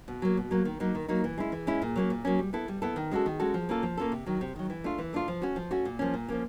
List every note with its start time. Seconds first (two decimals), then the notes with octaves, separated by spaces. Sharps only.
0.08 B2
0.22 F#3 A#3
0.37 B2
0.51 F#3 A#3
0.65 D#3
0.80 F#3 A#3 D#4
0.95 D#3
1.08 F#3 A#3 D#4
1.24 E3
1.38 G#3 C#4 E4
1.52 E3
1.67 G#3 C#4 E4
1.82 A#2
1.96 F#3 A#3 C#4
2.10 A#2
2.25 F#3 A#3 C#4
2.39 G3
2.53 B3 E4 A4
2.68 G3
2.82 B3 E4 A4
2.96 D#3
3.11 G#3 C#4 F#4 A4
3.26 D#3
3.39 G#3 C#4 F#4 A4
3.54 F3
3.69 A#3 C#4 F4 A4
3.83 F3
3.97 A#3 C#4 F4 A4
4.12 C3
4.26 D#3 F#3
4.41 C3
4.56 D#3 F#3
4.70 E3
4.84 A3 D4 F4
4.98 E3
5.13 A3 D4 F4
5.28 F3
5.42 A3 C#4 F#4
5.56 F3
5.71 A3 C#4 F#4
5.85 A#2
5.99 F3 A#3 C#4
6.14 A#2
6.29 F3 A#3 C#4